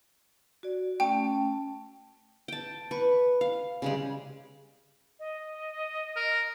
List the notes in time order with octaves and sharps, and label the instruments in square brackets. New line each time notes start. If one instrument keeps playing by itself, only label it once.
[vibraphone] F#4 D5
[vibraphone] A3 C#4 A5 [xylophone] G5
[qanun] G5 A5
B4 C#6
F5
C#3 G3 G#3
[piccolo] D#5
[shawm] A#4